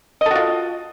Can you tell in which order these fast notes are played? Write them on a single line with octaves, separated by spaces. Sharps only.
D#5 A4 F#4 F4